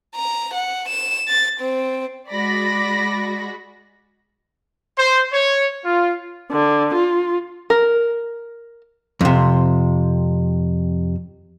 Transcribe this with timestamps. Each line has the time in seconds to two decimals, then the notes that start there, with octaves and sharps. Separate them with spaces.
0.15 A#5
0.54 F#5
0.88 E7
1.28 A6
1.60 C4
2.30 G#3 F#4 D5 B5 A#6
4.98 C5
5.33 C#5
5.84 F4
6.52 D3
6.95 F4
7.70 A#4
9.21 F2 C3